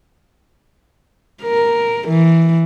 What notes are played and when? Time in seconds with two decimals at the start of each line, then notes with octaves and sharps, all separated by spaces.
1.43 A#4
2.08 E3